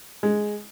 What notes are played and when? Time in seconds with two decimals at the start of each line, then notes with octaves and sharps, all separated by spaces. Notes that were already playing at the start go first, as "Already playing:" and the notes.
0.23 G#3